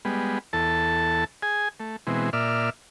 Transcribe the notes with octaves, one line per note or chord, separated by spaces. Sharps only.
G3 G#3 B3
E2 A4 A5
G#4 G#5
A3
B2 E3 G#3 C4
A#2 D5 E5 F6